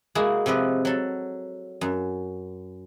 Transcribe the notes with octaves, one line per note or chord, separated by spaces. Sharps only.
G#3 A#3 E4 F#4 G#4
C3 F3 B4 D#5
F#3 A4
F#2